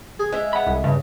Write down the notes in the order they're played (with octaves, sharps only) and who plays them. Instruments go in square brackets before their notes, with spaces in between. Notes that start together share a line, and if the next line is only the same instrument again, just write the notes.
[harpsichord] G#4
[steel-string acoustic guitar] G#3 E5
[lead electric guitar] F#5 B5
[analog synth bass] C2
[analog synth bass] G2 [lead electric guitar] C#3